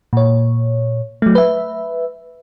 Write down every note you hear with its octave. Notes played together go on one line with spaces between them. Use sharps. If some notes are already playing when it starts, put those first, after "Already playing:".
A#2 C#5
F#3 A3
B4 E5